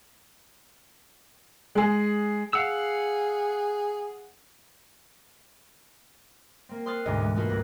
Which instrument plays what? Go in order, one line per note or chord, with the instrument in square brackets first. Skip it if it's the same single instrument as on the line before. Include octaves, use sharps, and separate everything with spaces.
[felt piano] G#3 G#4
[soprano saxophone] G#4 [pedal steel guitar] F5 F#5 E6
[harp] A#3 C4
C5 C6 D#6 F6 F#6 A6
D2 G#2 B2 D#5
E3 G#3
A3 A#3 D#4 F4 F#4 B4
G1 C#2 G#2 F#6 A#6